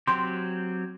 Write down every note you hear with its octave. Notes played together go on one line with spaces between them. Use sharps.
F#3 C4 G4 C6